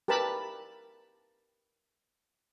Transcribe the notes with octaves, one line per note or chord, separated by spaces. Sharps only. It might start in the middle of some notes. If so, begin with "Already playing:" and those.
G4 A#4 B4 A5 B5